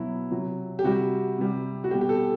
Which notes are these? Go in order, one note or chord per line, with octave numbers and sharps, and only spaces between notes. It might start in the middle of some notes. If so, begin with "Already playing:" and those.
Already playing: B2 F#3 E4
C3 F#3
G4
C3 G3 F#4
C3 G3
F#4
B2 G3 G4
G4
A4